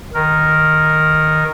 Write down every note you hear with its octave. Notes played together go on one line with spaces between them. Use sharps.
D#3 A#4